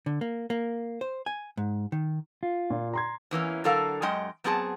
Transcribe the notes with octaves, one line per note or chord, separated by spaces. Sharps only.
D3
A#3
A#3
C5
G#5
G#2
D#3
F4
A#2
A#5 C6 G#6
E2 E3 A#3 C#4
D3 F#3 A4 A#4 F5
F#2 G#3 C#4 D#5 G5
F#3 B3 C4 G#4 A5